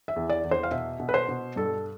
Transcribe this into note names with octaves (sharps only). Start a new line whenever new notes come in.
E5
E2
D5
E2
C5
F5
B2 E5
B2
B4
C5
B2
G2 A4